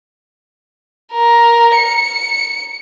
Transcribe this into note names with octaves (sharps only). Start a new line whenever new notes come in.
A#4
C#7